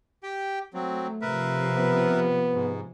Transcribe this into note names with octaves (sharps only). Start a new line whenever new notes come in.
G4 G5
F#3 A3 C4
C3 F3 A#4 B4 E5
B3
G#2